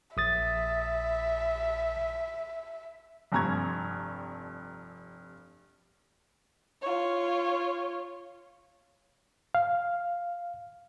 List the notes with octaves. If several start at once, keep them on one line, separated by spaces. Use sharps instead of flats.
A#1 E5 D#6 A6
F1 G2 C4 A#5 C#6 G#6
F4 C#5
F5